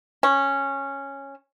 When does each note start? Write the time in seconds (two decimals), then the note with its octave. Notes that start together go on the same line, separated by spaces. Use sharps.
0.23 C#4